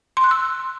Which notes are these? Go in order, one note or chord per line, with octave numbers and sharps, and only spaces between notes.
C6
F#6
E6